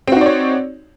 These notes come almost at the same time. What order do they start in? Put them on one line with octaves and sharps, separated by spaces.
C4 F#4 D#4 D5 C#5